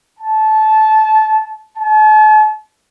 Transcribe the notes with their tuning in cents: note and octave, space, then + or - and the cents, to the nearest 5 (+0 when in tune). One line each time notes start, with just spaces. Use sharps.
A5 -20
A5 -40